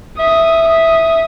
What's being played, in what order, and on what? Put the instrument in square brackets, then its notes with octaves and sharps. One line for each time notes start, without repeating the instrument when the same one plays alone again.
[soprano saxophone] E5 [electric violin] D#6
[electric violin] D#6